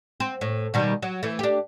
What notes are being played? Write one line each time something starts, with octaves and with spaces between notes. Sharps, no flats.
C4
A2
B2 D#3 G3
F#3
E3 A3
D4 G4